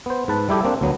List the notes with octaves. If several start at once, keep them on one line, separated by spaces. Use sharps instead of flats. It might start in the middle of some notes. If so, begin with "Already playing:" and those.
B3 C5
G#2 B4 A5
G3 E4 G4 A4
A#3 C4 D4
D2 F#3 B3